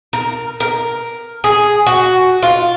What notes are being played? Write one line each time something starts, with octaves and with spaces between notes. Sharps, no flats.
A#4
A#4
G#4
F#4
F4